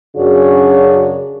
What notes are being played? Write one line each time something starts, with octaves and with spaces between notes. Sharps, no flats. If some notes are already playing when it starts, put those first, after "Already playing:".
F#2 C#3 D4 F#4 G#4 C#5